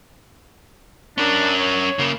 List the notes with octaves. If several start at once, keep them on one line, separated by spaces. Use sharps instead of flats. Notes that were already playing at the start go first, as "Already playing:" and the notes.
C#4 D4 A#4
C#5
C#3 A#3